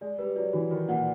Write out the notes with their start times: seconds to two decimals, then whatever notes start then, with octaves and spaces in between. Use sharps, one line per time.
0.01 G#3 D5
0.18 G3 B4
0.36 F#3 D5
0.53 E3 F#4
0.71 D#3 F#4
0.88 A#2 F#5